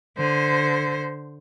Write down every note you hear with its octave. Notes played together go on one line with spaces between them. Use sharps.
D3 C5